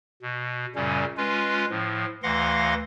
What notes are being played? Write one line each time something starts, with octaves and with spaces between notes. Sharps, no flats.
B2
F#2 A#2 C#3 G3 C#4
G#3 C#4 F4 B4
A2 F3
D2 E3 F5 F#5 C6 A#6